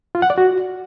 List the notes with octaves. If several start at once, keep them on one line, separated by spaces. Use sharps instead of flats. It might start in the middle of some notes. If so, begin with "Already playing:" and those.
F4
F#5
D5
F#4